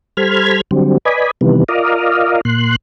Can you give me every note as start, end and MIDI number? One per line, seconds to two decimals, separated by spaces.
0.17 0.61 55
0.17 0.61 69
0.17 0.61 72
0.17 0.61 83
0.17 0.61 89
0.17 0.61 92
0.71 0.98 50
0.71 0.98 54
0.71 0.98 55
0.71 0.98 60
1.05 1.31 71
1.05 1.31 74
1.05 1.31 75
1.05 1.31 80
1.05 1.31 83
1.41 1.64 48
1.41 1.64 51
1.41 1.64 52
1.41 1.64 55
1.41 1.64 59
1.69 2.41 65
1.69 2.41 70
1.69 2.41 74
1.69 2.41 75
1.69 2.41 77
2.45 2.76 46
2.45 2.76 84
2.45 2.76 90